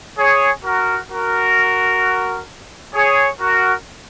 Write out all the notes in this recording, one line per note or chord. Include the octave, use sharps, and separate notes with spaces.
G#4 C#5
F#4 A#4
F#4 A#4
G#4 C#5
F#4 A#4